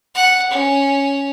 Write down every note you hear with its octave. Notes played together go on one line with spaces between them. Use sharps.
F#5
C#4